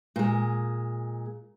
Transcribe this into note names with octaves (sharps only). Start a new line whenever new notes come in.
A#2 G#3